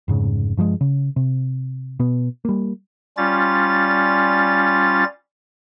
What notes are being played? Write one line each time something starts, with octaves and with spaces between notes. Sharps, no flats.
F1 G#2 C#3
G2 F3 G3 G#3
C#3
C3
B2 B3
G3 A#3
G3 C#4 F4 A6